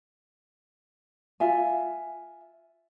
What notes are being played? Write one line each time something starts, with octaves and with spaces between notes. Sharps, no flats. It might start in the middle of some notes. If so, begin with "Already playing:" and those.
F4 E5 G#5